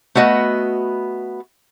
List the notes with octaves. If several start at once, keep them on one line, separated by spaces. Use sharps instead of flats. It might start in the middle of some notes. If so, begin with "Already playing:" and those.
A3 B3 F#4 D#5